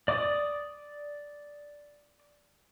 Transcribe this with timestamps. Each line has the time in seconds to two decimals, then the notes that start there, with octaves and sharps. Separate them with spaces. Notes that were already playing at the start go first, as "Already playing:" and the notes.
0.08 D5 D6 D#6